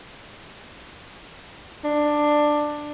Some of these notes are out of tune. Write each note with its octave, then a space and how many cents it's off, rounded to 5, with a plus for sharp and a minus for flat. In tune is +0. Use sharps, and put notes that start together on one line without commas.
D4 +10